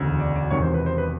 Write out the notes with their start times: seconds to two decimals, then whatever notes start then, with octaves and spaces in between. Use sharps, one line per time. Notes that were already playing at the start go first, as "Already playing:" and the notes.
Already playing: E1 D2 C#3
0.20 D5
0.36 D5
0.50 E1 E2 C3 D#3 C#5
0.63 C5
0.74 B4
0.86 C5
0.98 B4